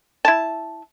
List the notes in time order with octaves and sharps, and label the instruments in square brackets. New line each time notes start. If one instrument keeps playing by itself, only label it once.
[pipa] E4 A5